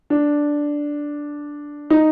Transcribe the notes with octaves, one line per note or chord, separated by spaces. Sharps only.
D4
D#4